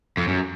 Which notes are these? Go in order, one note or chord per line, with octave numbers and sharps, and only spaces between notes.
F2
F#2